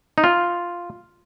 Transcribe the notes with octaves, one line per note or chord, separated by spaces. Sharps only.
D#4
F4